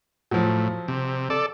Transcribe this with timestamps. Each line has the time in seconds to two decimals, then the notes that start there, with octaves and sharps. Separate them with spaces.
0.31 A2 F3 F#3
0.88 C3
1.30 A4 D5